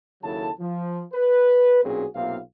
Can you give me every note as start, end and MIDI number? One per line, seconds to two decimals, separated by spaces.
0.23 0.50 39
0.23 0.50 49
0.23 0.50 54
0.23 0.50 64
0.23 0.50 69
0.23 0.50 81
0.60 1.02 53
1.14 1.83 71
1.84 2.06 35
1.84 2.06 46
1.84 2.06 60
1.84 2.06 61
1.84 2.06 66
1.84 2.06 68
2.15 2.39 35
2.15 2.39 48
2.15 2.39 58
2.15 2.39 59
2.15 2.39 65
2.15 2.39 77